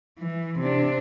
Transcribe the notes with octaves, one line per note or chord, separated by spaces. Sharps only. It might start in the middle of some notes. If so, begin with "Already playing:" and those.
E3
C3 D4